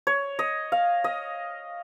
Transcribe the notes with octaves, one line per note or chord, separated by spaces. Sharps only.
C#5
D#5
F5
D#5